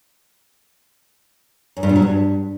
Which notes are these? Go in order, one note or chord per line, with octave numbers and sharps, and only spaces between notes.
F#2
G2
A#2
F#3
G2